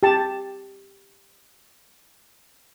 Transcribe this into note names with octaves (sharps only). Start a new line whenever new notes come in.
G4 A5